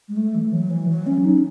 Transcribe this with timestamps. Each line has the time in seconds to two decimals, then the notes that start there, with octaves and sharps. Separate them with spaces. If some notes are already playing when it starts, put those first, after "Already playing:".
0.09 G#3
0.17 A3
0.35 E3
0.53 F#3
0.71 E3
0.89 F#3
1.07 C#4
1.25 D#4